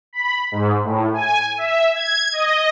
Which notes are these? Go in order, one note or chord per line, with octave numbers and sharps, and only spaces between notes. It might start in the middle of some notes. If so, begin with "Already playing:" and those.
B5
G#2
A2
G#5
E5
G#6
D#5